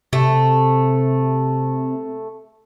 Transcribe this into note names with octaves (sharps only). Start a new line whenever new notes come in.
C3 A3